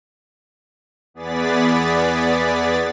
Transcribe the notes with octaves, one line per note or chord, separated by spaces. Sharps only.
E2 B3 G#4 D5 A6 B6